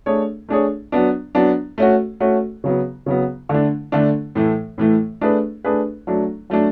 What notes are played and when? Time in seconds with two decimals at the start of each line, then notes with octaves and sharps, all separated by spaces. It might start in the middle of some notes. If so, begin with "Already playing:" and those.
0.06 A3 D4 G#4 C#5
0.49 A3 D4 G#4 C#5
0.92 F#3 B3 D4
1.35 F#3 B3 D4
1.78 A3 C#4 F#4
2.20 A3 C#4 F#4
2.64 C#3 F#3 B3
3.06 C#3 F#3 B3
3.49 D3 A3 D4
3.92 D3 A3 D4
4.35 A2 E3 A3
4.78 A2 E3 A3
5.21 A3 D4 G#4 B4
5.64 A3 D4 G#4 B4
6.07 F#3 A3 D4
6.50 F#3 A3 D4